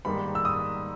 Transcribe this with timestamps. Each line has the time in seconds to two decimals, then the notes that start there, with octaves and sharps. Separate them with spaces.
0.05 G#2 D#3 G3 A#3 B5
0.35 E6
0.45 D#6